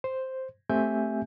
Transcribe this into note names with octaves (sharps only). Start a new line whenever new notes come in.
C5
A3 C4 G4 E5 G#5 G6